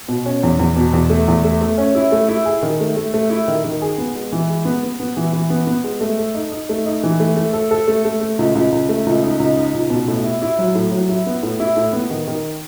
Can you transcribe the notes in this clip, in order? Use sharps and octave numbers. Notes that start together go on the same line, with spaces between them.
B2
C#4
E2
E2
B2
E2
A3
E2
A3
A3
C#4
E4
A3
E4
G#4
D#3
A3
A3
A3
E4
D#3
D#3
G#4
B3
G#3
E3
G#3
B3
B3
B3
E3
E3
B3
B3
G#3
A3
A4
D#4
D#4
A3
D#4
E3
A3
A3
A4
A4
A3
A3
A3
C#2
C#2
C#2
A3
C#2
D#4
C#2
D#4
C#2
B2
A2
E4
E4
F#3
A2
F#3
E4
B3
A2
E4
A2
B3
D#3
D#3